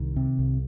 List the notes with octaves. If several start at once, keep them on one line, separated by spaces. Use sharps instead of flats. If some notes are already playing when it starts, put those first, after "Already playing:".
Already playing: C2 D#3
C3
C2